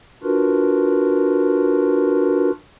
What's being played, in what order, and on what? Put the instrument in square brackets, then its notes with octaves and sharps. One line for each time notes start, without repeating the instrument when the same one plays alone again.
[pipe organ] D4 F4 F#4 A#4 B4